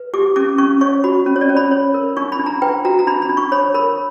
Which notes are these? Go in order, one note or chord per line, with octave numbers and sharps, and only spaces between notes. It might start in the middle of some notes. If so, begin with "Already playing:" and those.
Already playing: B4
G4 D6
C#4 D6
C#4 C#6
C#5 C#6
F#4 B5
C#4
C#5
D5
C#4
B5
C#5
A#4
D4 C#6
B5
D4
A#5
B4 G5
F#4 A#5
A#5
D4 B5
B5
D4
C#6
C#5 B5
A#4 B5